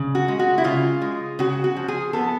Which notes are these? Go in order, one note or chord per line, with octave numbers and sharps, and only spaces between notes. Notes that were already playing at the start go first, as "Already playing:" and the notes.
Already playing: C#3
F#4
G#3
F#4
E4
C#3 F4
G#3
C#3 F#4
F#4
F3
G#4
B3 A4